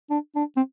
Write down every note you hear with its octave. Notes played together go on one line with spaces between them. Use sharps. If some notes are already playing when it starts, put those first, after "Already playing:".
D4
D4
C4